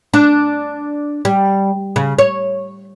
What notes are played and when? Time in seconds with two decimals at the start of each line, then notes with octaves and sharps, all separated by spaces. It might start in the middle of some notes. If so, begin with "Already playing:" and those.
0.14 D4
1.25 G3
1.96 C#3
2.19 C#5